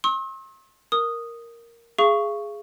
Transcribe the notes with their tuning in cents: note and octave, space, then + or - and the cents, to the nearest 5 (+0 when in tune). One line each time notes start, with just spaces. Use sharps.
C6 +45 E6 -40
A#4 +0 D#6 -5
G#4 +0 F5 -35 C#6 +0